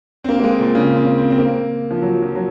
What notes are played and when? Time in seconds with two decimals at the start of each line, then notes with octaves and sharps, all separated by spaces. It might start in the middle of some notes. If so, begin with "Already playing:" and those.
0.24 C4
0.29 A#3
0.40 A#3
0.44 G#3
0.60 A#2
0.75 C#3
0.97 C4
1.18 C4
1.30 C4
1.38 A#3
1.91 F3
2.02 F#3
2.23 F3
2.35 F#3